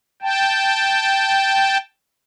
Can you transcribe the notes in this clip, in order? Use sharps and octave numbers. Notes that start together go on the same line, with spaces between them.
G5 A5